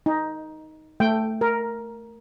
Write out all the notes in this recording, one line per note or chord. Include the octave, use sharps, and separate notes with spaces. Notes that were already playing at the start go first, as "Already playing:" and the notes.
D#4
A3 G5
A#4